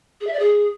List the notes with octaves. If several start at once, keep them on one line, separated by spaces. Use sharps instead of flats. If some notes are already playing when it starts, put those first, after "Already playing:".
G#4
E5
D5
G#4